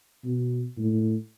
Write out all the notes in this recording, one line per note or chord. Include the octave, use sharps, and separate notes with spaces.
B2
A2